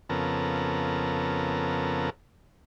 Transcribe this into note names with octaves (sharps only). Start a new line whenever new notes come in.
F2 C#3 B3 A4 A#4